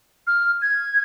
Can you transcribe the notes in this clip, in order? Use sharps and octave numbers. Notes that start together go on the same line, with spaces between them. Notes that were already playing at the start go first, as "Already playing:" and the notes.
F6
G#6